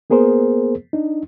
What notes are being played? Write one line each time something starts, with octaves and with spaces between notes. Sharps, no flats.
A#3 B3 G#4 A#4 C5
D4 D#4